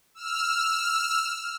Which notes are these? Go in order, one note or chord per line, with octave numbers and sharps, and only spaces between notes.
E6 F6